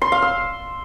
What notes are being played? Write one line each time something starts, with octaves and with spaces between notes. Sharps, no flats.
C6
F5
E6